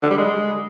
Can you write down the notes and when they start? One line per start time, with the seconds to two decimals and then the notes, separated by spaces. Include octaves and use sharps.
0.03 D3
0.11 G3
0.18 G#3